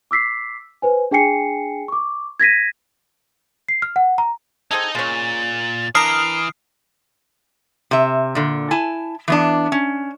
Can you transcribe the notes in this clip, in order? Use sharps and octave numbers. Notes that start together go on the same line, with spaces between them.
D6 E6 B6 C7
B4 C5 G#5
D4 G#4 G5 G#5 C7 C#7
C#6 D6
G#6 A#6 B6 D#7
C7
F6
F#5
A#5
C4 D#4 G#4 A4 D#5 G#6
A#2 G#3 C#4 A6
E3 D4 A#4 D#6 F6 C7 D7
C3 E5
A#2 D3
E4 G#5 A5
E3 B3 D4
C#4